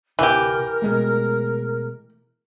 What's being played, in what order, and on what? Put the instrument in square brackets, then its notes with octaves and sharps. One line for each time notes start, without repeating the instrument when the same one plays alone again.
[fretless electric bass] D1 C3 [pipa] E3 G4 [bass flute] A#4
[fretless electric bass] B2 G#3 A3